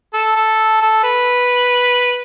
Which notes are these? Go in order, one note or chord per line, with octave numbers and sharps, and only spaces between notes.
A4
A4
A4
B4